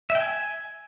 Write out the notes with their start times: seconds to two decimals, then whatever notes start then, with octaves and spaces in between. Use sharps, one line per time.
0.10 E5
0.15 G5
0.20 G#5